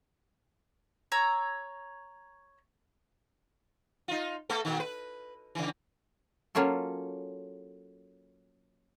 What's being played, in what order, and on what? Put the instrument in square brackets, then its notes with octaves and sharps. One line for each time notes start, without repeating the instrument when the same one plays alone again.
[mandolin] C#5 A#5 E6
[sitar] D#4 F4
A3 B3 A4
A#2 D#3
B4
C#3 E3
[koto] F#3 A#3 C#4 F4 A4